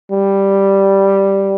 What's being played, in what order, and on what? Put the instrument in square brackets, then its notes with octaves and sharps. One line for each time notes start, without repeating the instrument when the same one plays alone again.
[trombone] G3